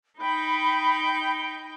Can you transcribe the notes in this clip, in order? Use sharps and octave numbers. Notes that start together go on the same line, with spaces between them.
D#4 G5 B5